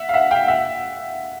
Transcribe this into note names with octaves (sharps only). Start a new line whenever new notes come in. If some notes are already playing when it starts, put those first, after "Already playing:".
Already playing: E5 F#5
F5
E5 F#5
F5 G5
E5 F#5